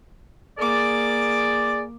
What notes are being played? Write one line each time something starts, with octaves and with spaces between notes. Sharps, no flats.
A#3 G#4 D5 D6